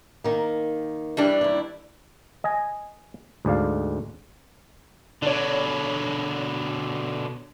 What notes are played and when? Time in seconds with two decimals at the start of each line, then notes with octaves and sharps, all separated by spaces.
0.24 D#3 A#3
1.17 E3 G3 D4
1.41 D#2 E4
2.44 D#5 G#5
3.45 D2 G#2 D5 F5
5.22 B2 D3 D4 C#5